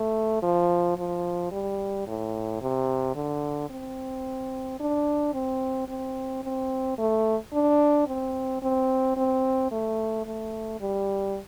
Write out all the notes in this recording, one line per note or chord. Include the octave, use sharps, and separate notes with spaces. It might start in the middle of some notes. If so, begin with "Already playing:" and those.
Already playing: A3
F3
F3
G3
A2
C3
D3
C4
D4
C4
C4
C4
A3
D4
C4
C4
C4
A3
A3
G3